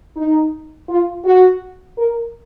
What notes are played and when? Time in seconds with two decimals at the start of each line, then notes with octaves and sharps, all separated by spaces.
0.17 D#4
0.89 F4
1.25 F#4
1.98 A#4